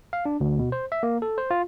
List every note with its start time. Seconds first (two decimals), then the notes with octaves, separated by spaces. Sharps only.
0.13 F5
0.25 D4
0.40 D2
0.59 B2
0.72 C5
0.92 E5
1.03 A#3
1.22 A4
1.38 C5
1.51 F4